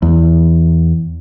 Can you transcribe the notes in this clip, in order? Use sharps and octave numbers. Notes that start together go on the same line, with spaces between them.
E2